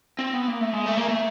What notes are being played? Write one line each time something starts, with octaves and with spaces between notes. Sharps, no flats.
C4
B3
A#3
A3
G#3
A3
A#3
A3